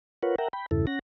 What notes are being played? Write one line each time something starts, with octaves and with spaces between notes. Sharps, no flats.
F4 A#4 B4 C#5 F#5
A#4 E5 F#5 G5 A#5
G5 B5
E2 G2 C#3 E4 A4
C#4 F#5 A#6